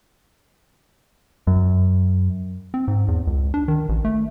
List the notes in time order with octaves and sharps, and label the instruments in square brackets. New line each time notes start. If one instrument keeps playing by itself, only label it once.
[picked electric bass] F#2
[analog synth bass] C4
G#2
E2
C#2
D4
D#3
A1
A3